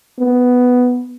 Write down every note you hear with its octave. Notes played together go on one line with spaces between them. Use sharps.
B3